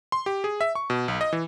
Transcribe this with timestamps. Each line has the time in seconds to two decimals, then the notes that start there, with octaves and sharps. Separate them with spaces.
0.12 C6
0.26 G4
0.44 G#4
0.61 E5
0.75 C#6
0.90 B2
1.08 B1
1.21 D#5
1.33 E3